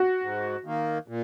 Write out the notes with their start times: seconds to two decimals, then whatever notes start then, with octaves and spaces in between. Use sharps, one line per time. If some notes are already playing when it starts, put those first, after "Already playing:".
Already playing: F#4
0.22 G#2
0.65 D#3 A#3
1.08 A#2